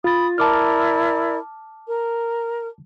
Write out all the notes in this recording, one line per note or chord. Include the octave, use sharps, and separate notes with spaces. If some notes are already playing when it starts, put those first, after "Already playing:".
F4 B5 D#6 A6
E4 A#4 D5 A5 D6 F6
A#4